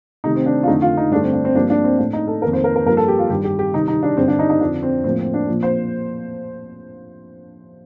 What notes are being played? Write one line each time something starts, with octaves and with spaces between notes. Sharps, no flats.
C3 D#3 A3 D#4
C4
D4
F4
F2 D3 A3 D#4
F4
D#4
G2 D3 A3 D4
C4
D4
C4
G2 F3 A#3 D4
D4
C4
A2 A3 D4
D#4
A4
F2 D#3 A#3 A#4
C5
A#4
A#4
G2 F3 A#3 A#4
A4
G4
F4
G2 D#3 G3 G4
G4
G4
C3 D#3 G3 D#4
D#4
D4
G2 D3 G3 C4
D4
D#4
D#4
F2 D3 F3 D4
C4
A2 F3 A#3 C4
C4
D4
A#2 F3 A#3
C5